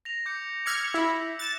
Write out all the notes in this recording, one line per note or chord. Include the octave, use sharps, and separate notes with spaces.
A#6 F7
D6 G6 C#7
D6 E6 F6 G#6 B6 C#7
E4
F#6 A6 E7